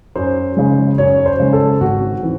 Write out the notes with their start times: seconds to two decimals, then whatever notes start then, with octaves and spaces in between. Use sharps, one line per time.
0.16 F#2 C5
0.57 C#3 G#3
0.98 F#2 C#5
1.26 C5
1.40 C#3 G#3
1.53 A4
1.81 G#1 F#4
2.23 E3 C4